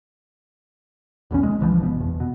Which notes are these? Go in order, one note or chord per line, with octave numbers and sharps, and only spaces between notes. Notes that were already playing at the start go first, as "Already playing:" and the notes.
D#1 B1 E2 C#4
G#3
C2 E3 F3
G1 B2
E2
B2